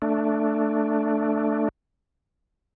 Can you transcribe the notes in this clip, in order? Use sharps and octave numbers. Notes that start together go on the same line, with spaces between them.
A3 D4